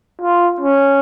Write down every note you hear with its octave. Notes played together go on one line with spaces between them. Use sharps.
F4
C#4